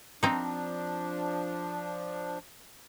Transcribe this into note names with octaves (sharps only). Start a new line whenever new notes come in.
F3 C4 D4 D#4